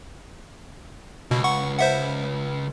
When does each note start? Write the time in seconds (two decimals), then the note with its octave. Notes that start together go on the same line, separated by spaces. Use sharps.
1.31 C#2 B2
1.44 F#5 C#6
1.79 C5 E5 F#5